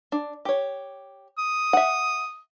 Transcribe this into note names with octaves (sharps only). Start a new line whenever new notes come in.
D4
G4 C#5
D#6
E5 F#5